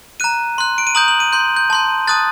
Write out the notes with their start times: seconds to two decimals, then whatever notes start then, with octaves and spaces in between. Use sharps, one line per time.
0.20 A#5 F#6 D#7
0.58 C6 F#6
0.78 D7
0.87 D#7
0.95 A#5 D#6 G6 F#7
1.08 F#7
1.20 D#7
1.33 C6 G6
1.56 G6
1.70 A5 C6 G6
2.07 A5 D#6 F#6 A6